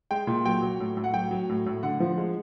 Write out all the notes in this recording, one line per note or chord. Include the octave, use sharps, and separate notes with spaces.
G#3 G5
A#2
F#3 G5
F#3
A2
A2
F#5
F#3 G5
F#3
A2
A2
D3 F#5
F3
G#3